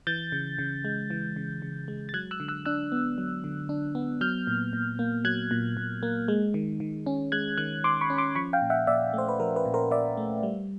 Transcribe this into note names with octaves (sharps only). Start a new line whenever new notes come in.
E3 G6 A6
C#3
C#3
G#3
E3
C#3
C#3
G#3
A6
F#3 F#6 G#6
E6 F#6
D3
E6 F#6
D4 E6 F#6
B3
F#3
D3
D4
B3
F#3 F6 G6
A#2
A#2
A#3
F#3 F#6 G#6
A#2
A#2
A#3
G#3
D#3
D#3
C#4
G#3 F#6 G#6
D#3 F#6 G#6
D#3 C6 D6
B5 C#6
C#4
C6 D6
F3 B5 C#6
F5 G5
A#2
E5 F#5
A#2 D5 E5
A3 C5
B4
F3 A#4
B4
A#2
A#4 C5
A#2 D5 E5
A3
G3